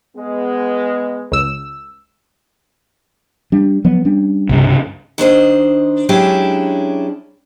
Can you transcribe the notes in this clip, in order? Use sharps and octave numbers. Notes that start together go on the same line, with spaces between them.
G#3 B3
C#2 E6
G3 D4
F3 F#3 B3
G3 C#4 D4
C2 G2 C#3
D#3 D4 C5 D#5
F#3 G#3 C#4 D4 E4 G4